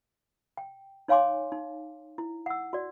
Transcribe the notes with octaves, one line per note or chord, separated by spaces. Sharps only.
G5
D#4 C#5 F5 G#5 C6 D6
D#4
E4
F#5 E6
F#4 D5